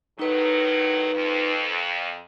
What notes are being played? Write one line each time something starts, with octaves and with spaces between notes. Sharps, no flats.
A2 D#3 F#3 D#4 B4
F2